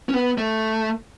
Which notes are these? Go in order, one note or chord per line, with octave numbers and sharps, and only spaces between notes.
C#4
B3
A3